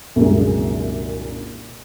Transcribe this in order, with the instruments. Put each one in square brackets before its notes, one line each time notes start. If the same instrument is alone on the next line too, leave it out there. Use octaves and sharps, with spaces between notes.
[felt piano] C2 F#2 A#2 D3 G#3